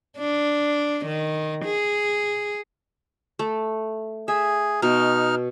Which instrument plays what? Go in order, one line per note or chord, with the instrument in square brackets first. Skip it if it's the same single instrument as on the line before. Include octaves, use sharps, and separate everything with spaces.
[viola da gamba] D4
D#3
G#4
[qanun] A3
[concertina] G#4 [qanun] E5
[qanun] B2 [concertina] D#4 F6